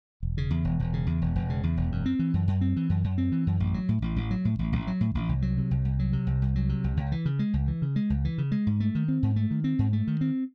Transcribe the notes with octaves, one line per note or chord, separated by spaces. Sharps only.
E1
C#3
E2
E1
E1
C#3
E2
E1
E1
C#3
E2
E1
F#2
C4
E3
F#2
F#2
C4
E3
F#2
F#2
C4
E3
F#2
A1
F#3
A2
A1
A1
F#3
A2
A1
A1
F#3
A2
A1
C2
F#3
C3
C2
C2
F#3
C3
C2
C2
F#3
C3
C2
C#2
E3
C#3
G#3
C#2
E3
C#3
G#3
C#2
E3
C#3
G#3
G#2
A3
D#3
C4
G#2
A3
D#3
C4
G#2
A3
D#3
C4